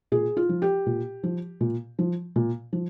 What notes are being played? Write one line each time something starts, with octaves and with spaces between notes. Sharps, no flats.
A#2 G#4
F4
F3
G4
A#2
F3
A#2
F3
A#2
F3